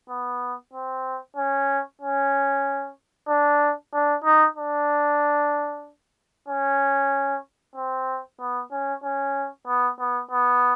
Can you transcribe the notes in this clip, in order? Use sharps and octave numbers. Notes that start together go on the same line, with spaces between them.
B3
C4
C#4
C#4
D4
D4
D#4
D4
C#4
C4
B3
C#4
C#4
B3
B3
B3